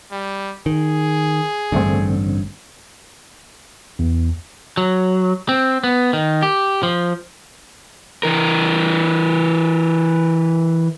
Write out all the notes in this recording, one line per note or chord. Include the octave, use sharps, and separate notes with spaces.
G3
D#3 G#4
A1 G2 D3 A3 C4
E2
F#3
C4
B3
D#3
G4
F3
E3 A#4